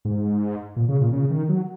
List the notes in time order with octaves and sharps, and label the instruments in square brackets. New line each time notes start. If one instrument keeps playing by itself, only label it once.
[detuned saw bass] G#2
A#2
C#3
A#2
C#3
D#3
F#3